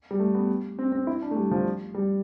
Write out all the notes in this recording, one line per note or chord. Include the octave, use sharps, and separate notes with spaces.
G3
A3
B3
C4
C4
E4
D4
A3
G3
F3
G3